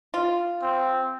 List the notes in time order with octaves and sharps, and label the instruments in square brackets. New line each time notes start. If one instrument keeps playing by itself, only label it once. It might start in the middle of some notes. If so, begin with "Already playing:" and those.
[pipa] F4
[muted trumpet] C4